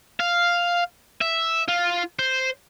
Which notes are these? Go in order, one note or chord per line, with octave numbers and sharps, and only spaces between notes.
F5
E5
F4
C5